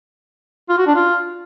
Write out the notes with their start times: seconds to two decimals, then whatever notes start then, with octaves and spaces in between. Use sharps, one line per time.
0.69 F4
0.78 F#4
0.87 D4
0.96 F4